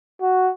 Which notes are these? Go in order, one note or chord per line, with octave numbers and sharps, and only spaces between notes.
F#4